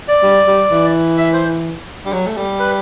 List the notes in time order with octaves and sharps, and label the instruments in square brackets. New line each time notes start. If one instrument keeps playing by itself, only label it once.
[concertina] D5
[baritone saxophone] G3
G3
E3
[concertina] E5
C5
[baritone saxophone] G3
F#3
A3
G3
[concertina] B4